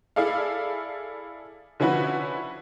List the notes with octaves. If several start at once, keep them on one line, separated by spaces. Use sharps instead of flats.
E4 G#4 A4 D5 F5
D3 F3 C#4 E4 F#4 B4